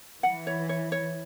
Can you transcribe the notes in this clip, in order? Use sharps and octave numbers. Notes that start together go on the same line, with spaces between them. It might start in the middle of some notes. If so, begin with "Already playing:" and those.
E3 F#5
C#5
C#5
C#5